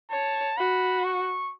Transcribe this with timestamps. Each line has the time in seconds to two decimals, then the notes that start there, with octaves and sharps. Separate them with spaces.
0.11 C#5 A5
0.57 F#4 B5
1.04 C#6